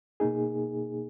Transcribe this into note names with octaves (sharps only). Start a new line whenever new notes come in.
B2 A#3 D#4 G#4